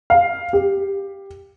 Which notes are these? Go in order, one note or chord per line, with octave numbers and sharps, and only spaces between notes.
F5
G4